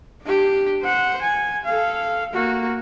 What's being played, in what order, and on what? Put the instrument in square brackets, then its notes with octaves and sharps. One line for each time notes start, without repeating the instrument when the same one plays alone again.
[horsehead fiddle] D4 G4
C5 F#5
G#5
A4 F5
A#3 F#4